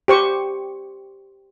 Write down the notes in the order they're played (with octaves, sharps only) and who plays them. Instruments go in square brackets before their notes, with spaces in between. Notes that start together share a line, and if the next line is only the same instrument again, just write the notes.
[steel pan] G4 C5 C#6